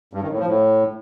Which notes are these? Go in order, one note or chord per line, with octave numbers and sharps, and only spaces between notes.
G2
D#3
A2
F3
A2